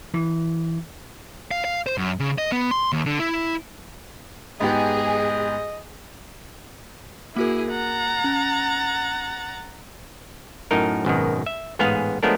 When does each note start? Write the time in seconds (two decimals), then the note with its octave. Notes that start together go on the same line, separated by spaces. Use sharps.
0.14 E3
1.51 F5
1.65 F5
1.86 C5
1.98 F#2
2.20 C#3
2.38 D#5
2.52 B3
2.71 C6
2.92 D#2
3.06 D3
3.19 E4
4.60 G#2 B3 G4 G#4 D#5
7.36 A#3 E4 F#4 G#4 A#4
7.73 F#5 A#5 A6
8.24 C#4
10.71 F#2 A2 D#4 A#4
11.05 G#1 F#2 B2 D#3
11.46 E5
11.79 A1 G#2 B3 G#4 F5
12.23 F3 G#3 A3 B3 D4 A#4